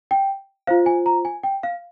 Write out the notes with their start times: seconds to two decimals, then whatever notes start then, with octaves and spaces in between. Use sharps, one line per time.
0.11 G5
0.67 F4 C5 F5
0.86 G#5
1.06 A#5
1.25 G#5
1.43 G5
1.63 F5